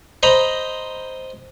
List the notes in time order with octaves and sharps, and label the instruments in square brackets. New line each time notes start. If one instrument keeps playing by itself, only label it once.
[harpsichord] C5 D#5 A#5 B5